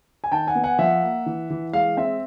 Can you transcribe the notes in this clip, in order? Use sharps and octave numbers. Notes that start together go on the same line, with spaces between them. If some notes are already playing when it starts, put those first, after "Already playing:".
G#5
D#3 G5 A5
F#5 G#5
B3
F#5 G#5
F3 E5 F#5
A#3
E3
E3
G#3 F5
C4 E5